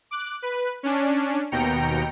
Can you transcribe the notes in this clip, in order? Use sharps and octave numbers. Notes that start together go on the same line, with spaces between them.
D6 F#6
B4
C#4 D4
D#2 B2 G5 A#5 C#7